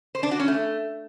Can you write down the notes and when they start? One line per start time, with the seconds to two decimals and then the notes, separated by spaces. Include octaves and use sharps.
0.15 C5
0.23 D4
0.31 F#4
0.39 C#4
0.48 A3